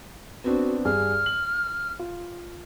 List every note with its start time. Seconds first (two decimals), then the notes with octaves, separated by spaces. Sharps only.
0.44 B3 C4 D4 F#4
0.85 G2 G#4 F6
1.26 F#7
1.99 F4